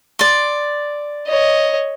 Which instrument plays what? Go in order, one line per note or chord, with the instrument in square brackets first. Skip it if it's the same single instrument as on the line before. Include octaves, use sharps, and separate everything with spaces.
[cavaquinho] D5 C6
[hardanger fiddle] C#5 D#5